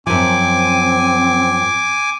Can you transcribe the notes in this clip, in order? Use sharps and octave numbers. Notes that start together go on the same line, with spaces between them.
F#2 F3 C4 G#5 D6